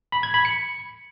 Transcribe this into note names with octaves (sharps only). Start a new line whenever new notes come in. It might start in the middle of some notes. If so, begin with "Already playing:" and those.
B5
G#6
B5
C#7